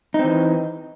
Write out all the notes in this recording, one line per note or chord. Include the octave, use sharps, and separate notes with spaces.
E3 C4 D#4